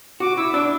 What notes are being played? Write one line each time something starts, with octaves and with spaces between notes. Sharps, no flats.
F#4 D6
E4 E6
D4 D6